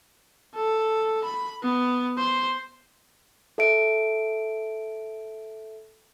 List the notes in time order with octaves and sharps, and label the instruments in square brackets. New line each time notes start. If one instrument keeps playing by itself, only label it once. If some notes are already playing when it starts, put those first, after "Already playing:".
[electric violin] A4
B5
B3
C5
[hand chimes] A4 E5 D7